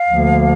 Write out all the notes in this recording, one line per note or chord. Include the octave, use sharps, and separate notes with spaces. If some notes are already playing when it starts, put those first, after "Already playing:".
Already playing: F5
D2 D3 F3 A#3